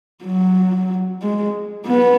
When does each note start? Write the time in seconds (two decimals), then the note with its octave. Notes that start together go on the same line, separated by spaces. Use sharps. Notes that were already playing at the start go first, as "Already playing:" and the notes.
0.24 F#3
1.22 G#3
1.87 B3